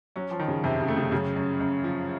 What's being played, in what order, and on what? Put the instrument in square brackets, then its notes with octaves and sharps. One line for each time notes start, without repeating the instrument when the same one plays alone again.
[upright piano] F#3 [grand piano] C#4
[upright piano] F3
[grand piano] D#3
[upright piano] C#3
[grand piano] F2 [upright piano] C3
[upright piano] C#3
[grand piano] A3
[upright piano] C#3
[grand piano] F#2 [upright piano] C#3
[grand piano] F#2
F#2
F3